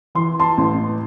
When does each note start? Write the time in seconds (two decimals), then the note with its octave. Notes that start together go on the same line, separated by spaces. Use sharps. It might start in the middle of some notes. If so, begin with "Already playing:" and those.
0.15 E3 C6
0.39 A5 C6
0.58 A1